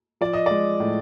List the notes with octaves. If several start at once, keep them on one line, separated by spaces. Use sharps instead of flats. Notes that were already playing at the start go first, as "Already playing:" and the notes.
F3 D5
D#5
G#3 D5
A2